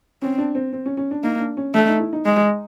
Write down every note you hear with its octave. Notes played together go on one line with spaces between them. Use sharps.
C4 C#4
D4
C4
C4
C#4
C#4
D4
A#3 D#4
D4
C#4
A3 D4
D#4
E4
D#4
G#3